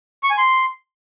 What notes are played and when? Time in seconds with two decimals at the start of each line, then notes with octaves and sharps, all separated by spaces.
0.23 C#6
0.30 G#5
0.38 C6